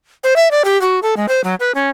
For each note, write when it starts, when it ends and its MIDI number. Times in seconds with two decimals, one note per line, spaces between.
0.24 0.34 72
0.36 0.51 76
0.51 0.62 74
0.64 0.80 67
0.81 0.99 66
1.02 1.14 69
1.17 1.26 56
1.28 1.41 72
1.44 1.55 54
1.60 1.72 71
1.75 1.89 61